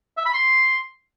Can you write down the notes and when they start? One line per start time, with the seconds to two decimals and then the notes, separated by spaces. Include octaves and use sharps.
0.17 E5
0.26 B5
0.34 C6